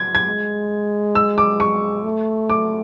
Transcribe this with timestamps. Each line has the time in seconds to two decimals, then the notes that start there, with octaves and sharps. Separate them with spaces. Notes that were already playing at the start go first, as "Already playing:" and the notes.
Already playing: G#6
0.15 G#6
0.26 G#3
1.15 E6
1.38 D6
1.60 C#6
2.04 A3
2.50 D6